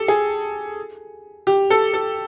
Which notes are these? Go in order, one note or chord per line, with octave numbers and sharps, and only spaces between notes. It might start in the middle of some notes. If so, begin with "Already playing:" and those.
Already playing: G4 A4
G#4
G4
A4
A4